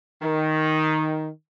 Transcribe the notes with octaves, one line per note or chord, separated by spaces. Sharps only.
D#3